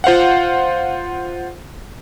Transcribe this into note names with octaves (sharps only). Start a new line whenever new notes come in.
F4 C5 F5 F#5